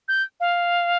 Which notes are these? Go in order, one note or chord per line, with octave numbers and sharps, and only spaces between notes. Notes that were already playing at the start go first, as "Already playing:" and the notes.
G6
F5